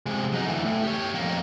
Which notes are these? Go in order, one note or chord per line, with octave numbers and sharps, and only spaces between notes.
C3 G#3
F#3 D#4
D2 E3
A2
G4 C#5
F2 A#3